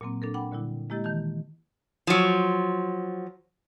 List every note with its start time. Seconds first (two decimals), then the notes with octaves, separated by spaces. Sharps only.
0.01 A#2 F#3 A#3 C4
0.22 D4 A4 A#4
0.34 F#5 G5 B5 D6
0.51 A#2 D3 G3 E4
0.90 G#3 A#3 E4 G4 D#5 A6
1.04 D#3 E3 A5 G6
2.07 F3 F#3